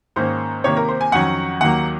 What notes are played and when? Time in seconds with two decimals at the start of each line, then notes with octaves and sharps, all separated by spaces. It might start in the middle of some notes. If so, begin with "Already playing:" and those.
0.16 G#2 D#3 A#3 C#4 C5
0.64 C3 D#3 A#3 C#5
0.77 A#4
0.88 C5
1.01 G#5
1.12 F2 D#3 F#3 C#4 F#5
1.60 D#2 D#3 F#3 A#3 F#5